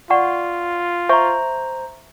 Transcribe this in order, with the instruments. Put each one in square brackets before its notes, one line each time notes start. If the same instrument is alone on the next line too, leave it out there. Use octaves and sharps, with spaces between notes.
[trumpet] F4 [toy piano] D5 F#5 C#6
[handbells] C5 A#5 [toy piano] E5 C#6